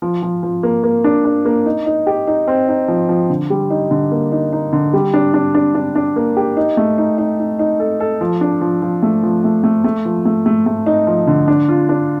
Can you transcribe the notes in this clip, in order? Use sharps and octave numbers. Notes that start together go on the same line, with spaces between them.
F3
F3
F3
A#3
A#3
D4
D4
A#3
D#4
D#4
G4
D#4
C4
D#4
F3
F3
D3
G3
D#4
D3
A#3
D#4
D#4
D3
G3
D4
D4
D4
D4
D4
A#3
G4
D#4
A3
D#4
D#4
D#4
D#4
A4
A4
F3
D4
F3
F3
A3
F3
A3
A3
A3
F3
A3
A3
A3
D#4
F3
D3
D4
F4
D4